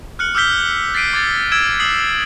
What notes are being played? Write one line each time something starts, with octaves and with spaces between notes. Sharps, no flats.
F6 F#6 C#7 F#7
D6 E6 F6 G6 B6 G7
A6 B6 C7 D7 D#7
D6 G#6 A6
E6 G#6 D7 E7
D#6 F6 C7 F#7